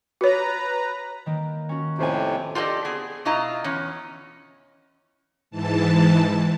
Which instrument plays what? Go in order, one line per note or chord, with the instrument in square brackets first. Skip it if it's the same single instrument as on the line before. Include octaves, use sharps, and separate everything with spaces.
[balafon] F#4 C#5 [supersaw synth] B4 A#5
[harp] D#3 A#3
C#4 F#4
[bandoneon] F2 A2 C3 [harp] G4 C5 G#5
[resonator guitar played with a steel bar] F4 G4 A4 C5 D5 D#5
B3 G#4
B2 E4 F4 D#5 A#5
E2 C#4
[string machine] G#2 E3 A5